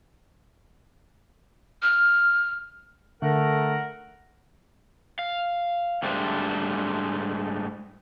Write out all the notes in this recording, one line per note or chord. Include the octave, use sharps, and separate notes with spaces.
F6
D3 A3 A#4 F#5
F5
G#2 G3 A3 D4 C5